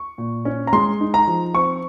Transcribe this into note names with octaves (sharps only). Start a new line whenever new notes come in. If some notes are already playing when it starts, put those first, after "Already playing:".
Already playing: C#6
A#2
C#4
A#5
G#3 C6
D#4
A#5
F3
C4 C#6